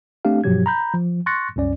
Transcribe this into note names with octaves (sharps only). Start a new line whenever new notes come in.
A3 C4 D4 G4 F5
G2 B2 F3 F#3 G4 G#6
A#5 B5 G6
F3
C6 C#6 F#6 A6 A#6 C#7
C2 F#2 C#4 D5